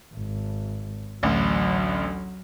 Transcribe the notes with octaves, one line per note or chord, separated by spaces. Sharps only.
G#1
A1 D2 F#3